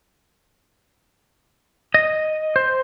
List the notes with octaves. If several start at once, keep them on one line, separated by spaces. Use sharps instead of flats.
D#5
C5